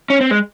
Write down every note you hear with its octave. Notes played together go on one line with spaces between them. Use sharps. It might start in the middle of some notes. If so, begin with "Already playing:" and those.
C#4
C4
G#3